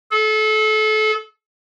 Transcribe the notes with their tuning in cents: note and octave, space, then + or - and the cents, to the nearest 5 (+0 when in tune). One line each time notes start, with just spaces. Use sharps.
A4 -30